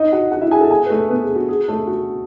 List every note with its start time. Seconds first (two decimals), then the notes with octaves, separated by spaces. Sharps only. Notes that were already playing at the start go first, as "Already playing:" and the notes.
Already playing: D#4 D#5
0.12 F#4 F#5
0.31 F#4 F#5
0.41 E4 E5
0.51 G#4 G#5
0.61 A4 A5
0.70 G#4 G#5
0.86 B4
0.90 A3 A4
1.09 B3 B4
1.23 G#4
1.36 F#4
1.49 G#4
1.68 A3 A4
1.87 F#4